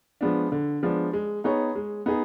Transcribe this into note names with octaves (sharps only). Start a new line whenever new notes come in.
F3 G#3 B3 D4
D3
F3 G#3 B3 D4
G#3
B3 D#4 G#4 C#5
G#3
B3 D#4 G#4